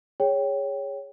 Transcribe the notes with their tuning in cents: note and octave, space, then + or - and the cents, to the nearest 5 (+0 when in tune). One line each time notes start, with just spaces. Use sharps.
G#4 -20 C#5 +5 G5 +0